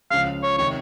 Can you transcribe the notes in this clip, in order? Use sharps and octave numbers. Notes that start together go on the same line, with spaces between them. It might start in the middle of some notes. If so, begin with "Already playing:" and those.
C#2 C#3 F3 F5
C#5
C3 D#3 C#5